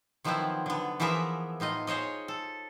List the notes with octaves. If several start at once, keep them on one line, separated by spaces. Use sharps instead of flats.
D#3 F3 F#3 B3 C4 E4
D3 B3
E3 F3 B3 G#4 A#4 E5
A2 D#4 F4 D#5
G#4 C5 C#5 D#5
A4